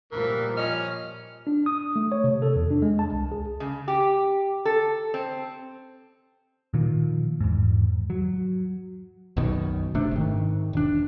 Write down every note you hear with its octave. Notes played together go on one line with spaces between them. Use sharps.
A#2 E3 F3 G3 A#4
C#4 D#5 F6
D4
D#6
A3
C#5
C3
A4
E2
D4
G#3
A5
C2
G#4
C#3
G4
A4
C4
A#2 D#3 F3
E2 G#2
F#3
B1 F#2 B2 D#3
G1 C3 A3 D4
G#2 D#3
E1 D4